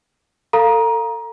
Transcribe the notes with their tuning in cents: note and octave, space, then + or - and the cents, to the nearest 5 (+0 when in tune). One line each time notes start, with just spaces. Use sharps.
A4 +30 F5 +0 A#5 +20